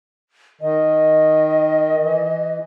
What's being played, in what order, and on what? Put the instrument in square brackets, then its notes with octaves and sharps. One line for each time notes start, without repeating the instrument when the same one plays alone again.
[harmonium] D#3 [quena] D#5
[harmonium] E3